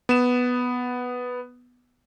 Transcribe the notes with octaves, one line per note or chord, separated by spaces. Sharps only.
B3 E7